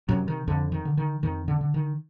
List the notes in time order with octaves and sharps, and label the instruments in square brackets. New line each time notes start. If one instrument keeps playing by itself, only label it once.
[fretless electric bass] F#2 C3 F#3
D#3
F2 D3
D#3
D3
D#3
F2 D#3
D3
D3
D#3